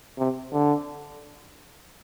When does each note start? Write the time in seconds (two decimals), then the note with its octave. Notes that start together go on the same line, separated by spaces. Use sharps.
0.18 C3
0.52 D3